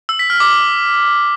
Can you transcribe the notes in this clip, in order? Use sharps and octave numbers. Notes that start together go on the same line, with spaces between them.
E6
B6
F6
D6